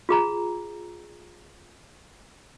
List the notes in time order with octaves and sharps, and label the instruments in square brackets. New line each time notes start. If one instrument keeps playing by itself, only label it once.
[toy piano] F4 G#4 A#5